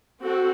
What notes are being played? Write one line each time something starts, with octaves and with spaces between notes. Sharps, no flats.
C4 F#4 A4